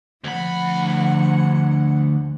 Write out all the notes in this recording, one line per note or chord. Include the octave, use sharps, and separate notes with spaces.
D2 F3 F#5 B5